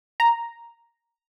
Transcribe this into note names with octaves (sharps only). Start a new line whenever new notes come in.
A#5